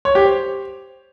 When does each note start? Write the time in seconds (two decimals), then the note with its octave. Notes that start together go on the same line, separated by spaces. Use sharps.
0.05 C#5
0.15 G4
0.25 C5